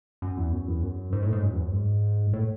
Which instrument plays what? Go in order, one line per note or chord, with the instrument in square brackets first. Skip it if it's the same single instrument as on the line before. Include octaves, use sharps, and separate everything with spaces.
[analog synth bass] F#2
E2
F#2
E2
F#2
G#2
A2
G#2
F#2
E2
F#2
G#2
A2